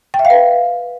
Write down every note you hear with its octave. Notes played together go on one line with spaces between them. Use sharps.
G5
E5
F5
B4